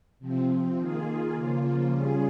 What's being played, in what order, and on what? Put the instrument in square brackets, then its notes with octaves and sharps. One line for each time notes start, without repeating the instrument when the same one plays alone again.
[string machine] C3 F3 C4
D#3 A#3 F4 G#4
C#3 F3 A#3 F4
C#3 G3 C#4 F4 G#4